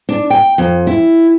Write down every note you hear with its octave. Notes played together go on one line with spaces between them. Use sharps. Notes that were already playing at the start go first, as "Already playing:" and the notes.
D4
G5
F2
E4